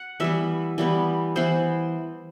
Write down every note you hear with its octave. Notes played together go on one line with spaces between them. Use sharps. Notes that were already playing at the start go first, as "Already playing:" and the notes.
Already playing: F#5
E3 G3 B3 E5
E3 G3 B3
E3 B3 C5